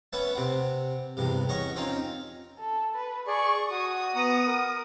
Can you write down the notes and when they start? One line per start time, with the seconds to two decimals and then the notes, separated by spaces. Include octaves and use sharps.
0.13 B3 C#4 E5 F#5 A5
0.35 C3 C4 F#5
1.17 E2 G2 C3
1.49 C#4 D#5 F#5 C#6
1.76 C4 C#4 D#4 F4
2.60 A4
2.95 B4
3.27 G#4 D5 C#6
3.70 F#4 D#6
4.16 B3 F#5 A#5
4.47 A#4